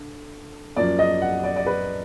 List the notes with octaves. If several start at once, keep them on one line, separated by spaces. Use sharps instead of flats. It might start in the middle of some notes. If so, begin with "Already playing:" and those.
Already playing: D3
F#2 F3 A#3 D5
D#5
F#5
D5
D5
B4